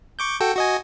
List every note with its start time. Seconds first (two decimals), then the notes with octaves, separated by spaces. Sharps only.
0.19 C#6 D6 G6
0.40 F#4 A4 G5
0.56 F#4 D#5 G#5